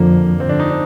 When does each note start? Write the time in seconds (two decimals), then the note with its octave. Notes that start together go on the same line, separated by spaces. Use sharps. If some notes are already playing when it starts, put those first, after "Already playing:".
Already playing: F2 D3 F3 A#3
0.40 G2 D3 F3 C4
0.49 D4
0.60 D#4
0.70 D4